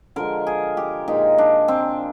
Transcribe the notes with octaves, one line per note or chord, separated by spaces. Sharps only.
D3 F3 G#3 A#4
G#4
G4
A#2 F3 G#3 D#4
D4
C4